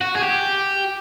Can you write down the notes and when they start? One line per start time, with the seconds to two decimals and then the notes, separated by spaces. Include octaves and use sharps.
0.01 F#4
0.16 G#4
0.23 G4